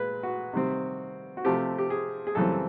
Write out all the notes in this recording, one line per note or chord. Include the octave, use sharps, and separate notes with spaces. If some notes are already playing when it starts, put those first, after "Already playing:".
Already playing: A#2 G#3 B4
F#4
C3 D#3 G3 C4
F#4
C3 F3 A3 C4 G4
G4
G#4
G#4
F#2 C#3 E3 G3 C4 A4